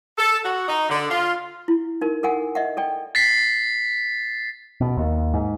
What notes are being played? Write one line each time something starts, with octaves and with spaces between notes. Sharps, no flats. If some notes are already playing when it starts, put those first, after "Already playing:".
A4
F#4
D#4
D3
F4
E4
D#4 A#4
A4 A#4 F#5 G#5
D#5 E5 F#5
A4 D5 G5
A6 B6 C7
B2
D#2
G#2